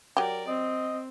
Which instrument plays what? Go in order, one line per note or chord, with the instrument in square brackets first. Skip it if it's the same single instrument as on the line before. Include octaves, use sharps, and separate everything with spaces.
[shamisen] F#3 G4 [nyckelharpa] A#4 D5
[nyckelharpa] C4 [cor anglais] D#5